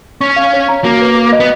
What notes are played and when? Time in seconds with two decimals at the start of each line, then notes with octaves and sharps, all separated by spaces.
0.21 C#4 C#6
0.36 F5
0.53 C#5
0.69 A#5
0.84 A#3 F#4
1.01 B4
1.16 F#4
1.33 D#5
1.40 B3